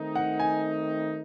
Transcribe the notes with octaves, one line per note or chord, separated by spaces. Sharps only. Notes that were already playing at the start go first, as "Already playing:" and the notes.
Already playing: D#3 A3 C4 D#4
F#5
G#5